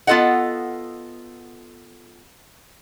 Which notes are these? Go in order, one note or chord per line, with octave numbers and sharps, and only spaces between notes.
B3 F4 A4 D#5 F#5